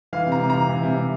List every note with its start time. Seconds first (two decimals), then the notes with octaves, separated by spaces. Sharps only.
0.13 E3 F5
0.26 C3
0.32 A#5
0.40 C3
0.50 A#5
0.55 E3
0.69 E3
0.83 C3
0.97 C3